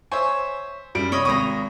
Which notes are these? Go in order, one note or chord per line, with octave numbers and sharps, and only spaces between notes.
C5 C#5 E5 G#5
F#2 G3 D7
C3 C#5 D#5 B5
G#1 A#5 C#6 D#6